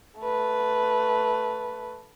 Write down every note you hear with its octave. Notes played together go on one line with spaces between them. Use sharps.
A3 B4